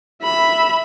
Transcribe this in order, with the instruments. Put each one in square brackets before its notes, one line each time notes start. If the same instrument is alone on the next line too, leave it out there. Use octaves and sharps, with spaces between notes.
[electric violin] E5 B5